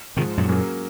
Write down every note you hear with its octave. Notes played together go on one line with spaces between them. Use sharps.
G#2 C3 D#3 F3 G#3
F#2 A#2
F#3 A#3 C#4 G#4